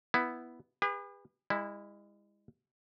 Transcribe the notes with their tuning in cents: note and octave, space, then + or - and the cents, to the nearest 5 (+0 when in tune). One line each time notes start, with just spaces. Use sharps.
B3 +0 E4 +0
G#4 -45 B4 +0
G#3 -40 E4 -10